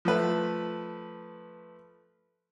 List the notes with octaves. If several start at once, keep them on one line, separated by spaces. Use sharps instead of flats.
F3 A3 B4